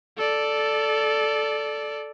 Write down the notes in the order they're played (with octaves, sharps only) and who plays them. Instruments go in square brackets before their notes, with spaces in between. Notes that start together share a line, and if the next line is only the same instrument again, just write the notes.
[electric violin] A4 D5